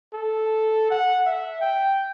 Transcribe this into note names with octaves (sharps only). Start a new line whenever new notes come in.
A4
F#5
E5
G5